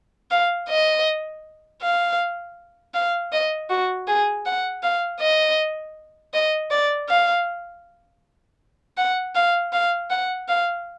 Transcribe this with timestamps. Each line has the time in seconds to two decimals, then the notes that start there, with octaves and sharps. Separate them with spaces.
0.31 F5
0.69 D#5
1.82 F5
2.94 F5
3.32 D#5
3.70 F#4
4.07 G#4
4.45 F#5
4.83 F5
5.20 D#5
6.34 D#5
6.71 D5
7.09 F5
8.98 F#5
9.35 F5
9.73 F5
10.10 F#5
10.48 F5